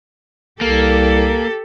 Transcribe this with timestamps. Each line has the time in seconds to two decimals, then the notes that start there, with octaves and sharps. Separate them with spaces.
0.61 C2 A#3 G4 A4